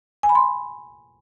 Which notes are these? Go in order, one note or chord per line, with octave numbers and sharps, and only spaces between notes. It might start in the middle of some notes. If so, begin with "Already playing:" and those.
G#5
B5
C6